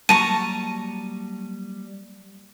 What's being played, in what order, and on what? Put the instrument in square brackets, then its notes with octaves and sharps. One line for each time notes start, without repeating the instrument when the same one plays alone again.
[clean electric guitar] F#3 G3 A#3 [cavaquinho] A5 A#5 C#6 [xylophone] D#7